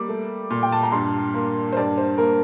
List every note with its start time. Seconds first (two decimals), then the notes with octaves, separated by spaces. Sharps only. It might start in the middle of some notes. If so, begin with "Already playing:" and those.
Already playing: G3 A#3 D6
0.09 A3
0.50 A#2
0.63 G5
0.72 A5
0.83 A#5
0.92 G2 C6
1.34 A#3
1.73 C5
1.77 G2 D5
1.98 C5
2.18 A#3 A#4